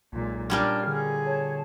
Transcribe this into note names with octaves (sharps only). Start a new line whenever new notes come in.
B1 A#2 G#3
A#2 G3 C#4 D4 F6
D3 G#4
C#5 A5